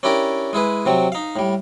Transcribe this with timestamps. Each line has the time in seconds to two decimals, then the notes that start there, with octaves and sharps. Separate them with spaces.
0.03 C#4 D4 E4 G4 A#4 D5
0.53 G#3 E4 G#4 B4
0.86 C3 F#3 C4
1.12 D#4 F5
1.36 A2 G3